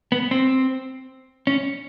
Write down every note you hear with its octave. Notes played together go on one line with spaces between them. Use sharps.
B3
C4
C#4